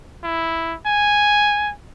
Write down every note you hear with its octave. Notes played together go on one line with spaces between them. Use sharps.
E4
G#5